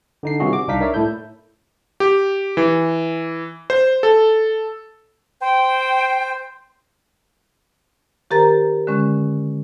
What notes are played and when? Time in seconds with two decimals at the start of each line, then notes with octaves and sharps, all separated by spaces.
0.23 D3 D#4 C7
0.40 C3 D#3 G3 F4 F#4 G#4
0.53 D6
0.68 C2 D4 D#4 F5 B6
0.81 A#4 C#5 D5 E5
0.94 A2 E4 A4 G6
2.00 G4
2.57 E3
3.70 C5
4.03 A4
5.41 C5 G5
8.31 D#3 G4 A#4 C5 A#5 A6
8.87 D3 G#3 C#4